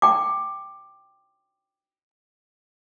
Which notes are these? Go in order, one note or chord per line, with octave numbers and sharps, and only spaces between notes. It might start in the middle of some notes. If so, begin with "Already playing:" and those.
G5 D6